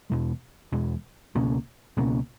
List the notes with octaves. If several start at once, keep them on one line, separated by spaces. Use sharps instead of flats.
E2 B2 G#3
E2 B2 G#3
C#2 B2 A#3 C#4
C#2 B2 A#3 C#4